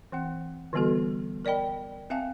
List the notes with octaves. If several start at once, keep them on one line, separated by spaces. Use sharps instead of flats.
E3 C4 F#5
D3 E3 G3 B3 F#4 A4
A#4 D5 D#5 G5 B5
C4 E5 F5 G#5 A5